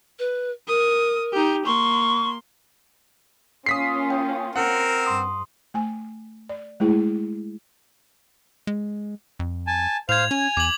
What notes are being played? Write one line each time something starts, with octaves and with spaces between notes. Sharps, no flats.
B4
A#4 D#6
D#4 G4
A#3 C6 C#6
A#3 C#4 F4 D#6 B6 C7
G5
C4 A#4 F#5 C#7
G2 C6 D#6
A3 G#5
D5
G#3 A3 E4 G#4
G#3
F2
G#5 A5
A2 C5 F5 G#6 F7
C#4 G#5
E2 D6 F#7